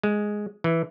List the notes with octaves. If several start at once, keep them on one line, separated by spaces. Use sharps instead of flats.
G#3
E3